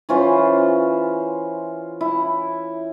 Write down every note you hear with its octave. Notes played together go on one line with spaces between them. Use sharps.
E3 C#4 F4 C5
E4